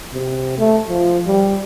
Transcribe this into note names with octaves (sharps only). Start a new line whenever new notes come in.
C3
A3
F3
G3